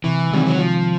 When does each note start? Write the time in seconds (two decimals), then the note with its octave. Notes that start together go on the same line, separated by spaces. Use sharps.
0.04 C3 E3
0.31 D#3 G3 G#3 C4
0.46 F#3
0.59 C3 F3